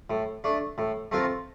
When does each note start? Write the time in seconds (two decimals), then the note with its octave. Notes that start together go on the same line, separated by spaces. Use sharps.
0.10 A2
0.44 A3 D4
0.78 A2
1.12 A3 C4 F4 A#4